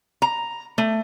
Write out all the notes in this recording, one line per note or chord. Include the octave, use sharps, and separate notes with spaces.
A#5
A3